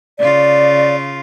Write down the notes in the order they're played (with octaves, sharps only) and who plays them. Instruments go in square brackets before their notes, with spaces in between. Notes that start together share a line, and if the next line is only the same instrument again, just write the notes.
[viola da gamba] C#3 F4 [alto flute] D5